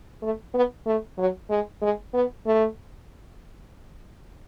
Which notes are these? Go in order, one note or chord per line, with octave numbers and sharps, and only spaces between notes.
A3
B3
A3
F#3
G#3
G#3
B3
A3